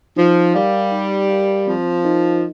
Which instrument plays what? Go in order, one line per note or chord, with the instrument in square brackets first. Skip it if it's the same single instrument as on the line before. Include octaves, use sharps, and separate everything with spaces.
[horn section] F3 [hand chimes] D#4
[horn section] G3 [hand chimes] A#4 F5
[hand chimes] D#4
A#4 F5
[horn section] F3 [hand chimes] C4
[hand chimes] D#4 A#4 D#5